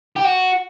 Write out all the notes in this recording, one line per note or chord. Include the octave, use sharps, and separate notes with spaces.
G4
F#4